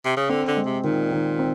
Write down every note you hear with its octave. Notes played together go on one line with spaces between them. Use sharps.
C3
C#3
D3 C4
D3
G#3
C3
A#2 D#3
D#3
C4